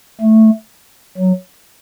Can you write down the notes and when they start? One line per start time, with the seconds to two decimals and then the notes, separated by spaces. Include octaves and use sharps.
0.20 A3
1.18 F#3